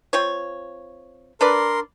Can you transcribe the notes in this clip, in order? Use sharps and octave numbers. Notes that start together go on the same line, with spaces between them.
C4 F4 C#5
D4 A#4 B4 D5 C6